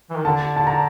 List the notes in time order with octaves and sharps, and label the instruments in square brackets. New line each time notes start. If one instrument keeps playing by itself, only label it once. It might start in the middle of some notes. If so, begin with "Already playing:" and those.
[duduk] E3
D#3
[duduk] D3 [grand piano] A5
[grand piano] A5
A#5